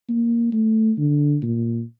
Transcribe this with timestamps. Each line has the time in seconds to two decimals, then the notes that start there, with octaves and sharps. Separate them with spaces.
0.09 A#3
0.53 A3
0.98 D3
1.42 A#2